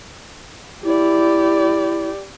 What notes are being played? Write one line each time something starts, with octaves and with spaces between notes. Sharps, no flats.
E4 G4 D5